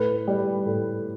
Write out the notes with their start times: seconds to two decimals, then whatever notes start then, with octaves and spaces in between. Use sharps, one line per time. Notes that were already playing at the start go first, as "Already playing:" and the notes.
Already playing: A2 B4
0.28 G3
0.66 A2